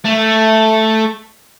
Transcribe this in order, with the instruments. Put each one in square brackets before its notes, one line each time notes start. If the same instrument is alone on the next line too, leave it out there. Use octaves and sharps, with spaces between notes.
[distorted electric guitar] A3